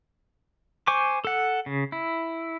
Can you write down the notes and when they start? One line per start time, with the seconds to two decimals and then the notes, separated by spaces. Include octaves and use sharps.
0.87 C5 G#5 C#6 D6
1.25 A4 F#5
1.66 C#3
1.92 E4